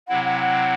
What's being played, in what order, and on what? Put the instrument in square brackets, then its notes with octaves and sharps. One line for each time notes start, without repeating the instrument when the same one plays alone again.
[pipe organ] C3 F#3 C4 E4 [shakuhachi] F#5
[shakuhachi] F#5
F#5